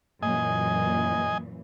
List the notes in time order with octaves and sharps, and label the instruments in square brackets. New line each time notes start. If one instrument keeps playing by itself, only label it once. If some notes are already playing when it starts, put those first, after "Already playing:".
[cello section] F#2 A#2 E3 [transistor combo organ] D#5 G#5